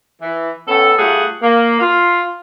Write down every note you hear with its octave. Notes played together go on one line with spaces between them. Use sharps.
E3
A2 B3 C#4 A4
G3 A3 F4 G#4 F#5
A#3
F4 F5